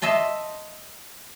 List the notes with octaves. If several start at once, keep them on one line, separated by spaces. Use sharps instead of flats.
D#5 E5 A5 C6